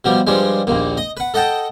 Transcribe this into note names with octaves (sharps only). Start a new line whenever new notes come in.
B2 F3 G3
G2 F3 G3 G#3
A#1 D#2 A#2
D#5
B4 F#5
A4 D#5 F#5 G5 A5